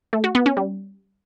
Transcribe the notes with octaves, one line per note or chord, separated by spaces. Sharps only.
A3
F#4
B3
C#4
G3